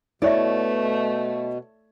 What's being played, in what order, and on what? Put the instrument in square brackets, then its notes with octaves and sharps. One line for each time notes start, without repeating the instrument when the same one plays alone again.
[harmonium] B2 [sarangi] A3 [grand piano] E4 C#5 E5 [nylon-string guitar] D5